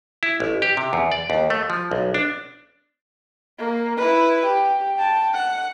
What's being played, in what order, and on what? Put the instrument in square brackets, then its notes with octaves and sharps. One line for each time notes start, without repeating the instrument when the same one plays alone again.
[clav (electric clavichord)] E4
A1
G4
C3
E2
D5
D#2
A3
F3
B1
D4
[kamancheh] A#3
E4 B4
G4
G5 A5
F#5